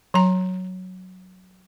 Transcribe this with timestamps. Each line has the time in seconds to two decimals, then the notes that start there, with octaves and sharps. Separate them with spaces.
0.14 F#3 A#5